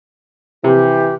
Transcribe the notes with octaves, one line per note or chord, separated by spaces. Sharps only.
C3 E3 G4